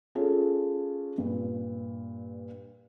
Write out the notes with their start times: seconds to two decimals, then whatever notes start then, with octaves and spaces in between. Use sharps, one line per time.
0.15 C#4 F4 G#4 A4 C#5
1.18 G2 A#2